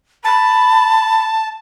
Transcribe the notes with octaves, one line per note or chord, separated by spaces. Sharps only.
A5 B5